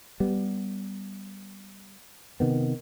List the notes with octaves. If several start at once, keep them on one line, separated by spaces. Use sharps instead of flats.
G3 B3
C3 D#3 B3